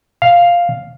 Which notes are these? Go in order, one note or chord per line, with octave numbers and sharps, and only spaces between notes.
F5